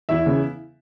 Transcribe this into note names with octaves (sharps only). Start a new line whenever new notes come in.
E2 E4 E5
C#3 E3 B3